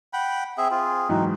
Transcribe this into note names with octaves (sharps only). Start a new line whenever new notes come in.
F#5 G5 B5
C4 G#4 E5
C4 F4 G#4
G#2 E3 F#3 C4 D#4